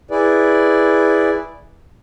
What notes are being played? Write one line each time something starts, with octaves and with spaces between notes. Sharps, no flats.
E4 G#4 B4 D5